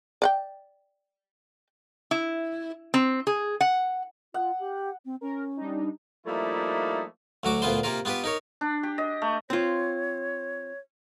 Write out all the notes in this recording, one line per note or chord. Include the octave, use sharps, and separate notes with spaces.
D5 F#5 G5
E4
C4
G#4
F#5
F4 F#5
G4
C4
C#4 A#4
G3 D4 D#4
F3 G3 A3 A#3 D#4 E4
D2 F#3 F#4 D6
D2 A#2 B3 F4 C5 C6
C3 A#3 F4 A#4
B3 F4 G4 B4
D#4 A#4 C#5
D4
G4
D#5
A3
C4 F4 C#5